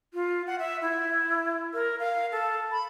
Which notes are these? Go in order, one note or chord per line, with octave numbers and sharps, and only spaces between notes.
F4
F#5
E5
E4
A#4
F5
A4
B5